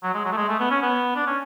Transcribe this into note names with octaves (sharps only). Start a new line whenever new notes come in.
F#3
G#3
F#3
A3
G#3
A3
B3
C#4
B3
D4
C#4